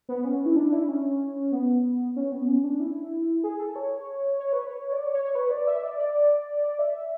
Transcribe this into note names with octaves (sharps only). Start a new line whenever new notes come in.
B3
C#4
E4
D4
E4
C#4
B3
C#4
B3
C#4
D4
E4
G#4
A4
C#5
C#5
B4
C#5
D5
C#5
C#5
C#5
B4
D5
E5
D5
D5
D5
E5